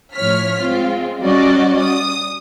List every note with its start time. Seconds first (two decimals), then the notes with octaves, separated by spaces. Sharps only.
0.14 A2 F3 C#5 F6 B6
0.61 G#3 C4 F4
1.21 G3 C#4 F#4 D5 D#5
1.80 D#6